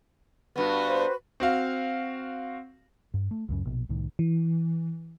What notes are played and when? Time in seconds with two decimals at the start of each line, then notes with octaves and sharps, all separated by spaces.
0.56 G2 B3 F#4 B4
0.87 C5
1.40 C4 F#4 F5
3.14 G2
3.31 A3
3.49 C#2 F#2 C#3
3.65 A#1 B2
3.89 C2 A2 D#3
4.19 E3